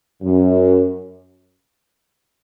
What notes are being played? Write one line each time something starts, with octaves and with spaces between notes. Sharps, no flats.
F#2